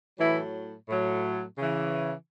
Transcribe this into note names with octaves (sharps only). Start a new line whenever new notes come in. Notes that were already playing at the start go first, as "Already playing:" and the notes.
A2 E3 F#3 E4
A2 F#3
C#3 E3